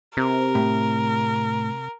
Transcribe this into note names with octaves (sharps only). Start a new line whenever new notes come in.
C3 A#4
A2